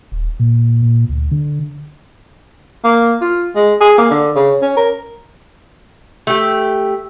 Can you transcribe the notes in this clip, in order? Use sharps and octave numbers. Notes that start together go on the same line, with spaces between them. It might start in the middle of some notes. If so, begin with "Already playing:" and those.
D#1
A#2
A#2
D2
D3
A#3
F4
G#3
G#4
A#3
D3
C#3
C#4
A#4
A3 G4